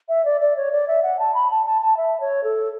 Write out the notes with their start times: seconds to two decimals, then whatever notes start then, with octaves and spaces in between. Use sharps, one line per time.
0.09 E5
0.25 D5
0.41 D5
0.56 C#5
0.72 D5
0.88 E5
1.03 F#5
1.19 A5
1.34 B5
1.51 A5
1.66 A5
1.82 A5
1.97 E5
2.20 C#5
2.44 A4